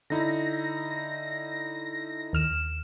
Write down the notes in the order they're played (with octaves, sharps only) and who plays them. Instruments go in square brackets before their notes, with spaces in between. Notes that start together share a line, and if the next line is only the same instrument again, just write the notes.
[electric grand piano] D3 D#4 E4 [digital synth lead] A#6
[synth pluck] D#2 F6 E7